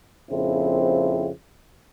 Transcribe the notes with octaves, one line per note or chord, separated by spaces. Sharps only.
A#1 F2 C#3 F3 C4 E4